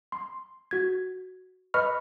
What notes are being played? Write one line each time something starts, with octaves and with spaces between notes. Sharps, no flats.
C6
F#4 G#6
B4 D#5 B5 C#6 F6